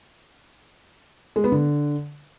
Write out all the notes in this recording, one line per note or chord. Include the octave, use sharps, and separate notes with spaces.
G#3
B3
D3